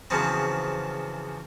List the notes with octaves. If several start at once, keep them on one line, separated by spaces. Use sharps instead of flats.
E2 C#3 F3 F#3 B3 C4